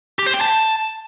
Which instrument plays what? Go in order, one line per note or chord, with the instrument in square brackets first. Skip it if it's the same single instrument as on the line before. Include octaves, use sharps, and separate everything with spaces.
[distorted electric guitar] G4
C5
G5
A5